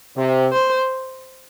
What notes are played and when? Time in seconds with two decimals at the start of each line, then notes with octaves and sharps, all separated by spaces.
0.16 C3
0.52 C5